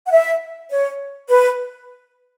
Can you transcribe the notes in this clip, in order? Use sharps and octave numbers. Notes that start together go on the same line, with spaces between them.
F#5
E5
C#5
B4